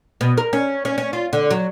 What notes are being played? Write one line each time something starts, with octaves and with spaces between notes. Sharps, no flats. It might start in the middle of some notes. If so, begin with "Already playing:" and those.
B2
A#4
C#4
C#4
C#4
F4
D3
F#3